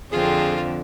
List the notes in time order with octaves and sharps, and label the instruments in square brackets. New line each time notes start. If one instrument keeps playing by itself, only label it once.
[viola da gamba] F2 D3 [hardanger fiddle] C4 F4 [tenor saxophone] G#4